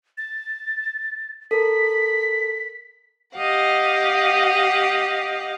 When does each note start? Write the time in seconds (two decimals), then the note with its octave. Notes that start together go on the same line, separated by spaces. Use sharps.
0.18 A6
1.51 A4 A#4 B6
3.36 G4 D#5 F5 F#5